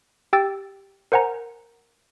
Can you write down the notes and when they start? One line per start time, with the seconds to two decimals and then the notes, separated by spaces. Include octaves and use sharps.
0.33 G4 G5 E6 A6
1.12 A#4 C5 F#5 G#5 A#5